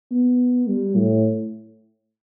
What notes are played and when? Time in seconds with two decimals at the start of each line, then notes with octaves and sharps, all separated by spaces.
0.12 B3
0.68 G3
0.96 A2